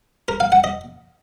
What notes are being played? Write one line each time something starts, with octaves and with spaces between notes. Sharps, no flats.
A#4
F5
F#5
D#5